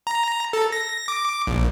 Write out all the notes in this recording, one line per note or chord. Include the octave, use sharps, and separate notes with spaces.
A#5
A4
A#6
D6
A#1